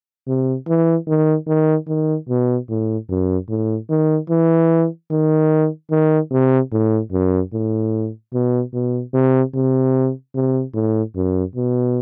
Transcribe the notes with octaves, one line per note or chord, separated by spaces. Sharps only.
C3
E3
D#3
D#3
D#3
B2
A2
F#2
A2
D#3
E3
D#3
D#3
C3
A2
F#2
A2
B2
B2
C3
C3
C3
A2
F#2
B2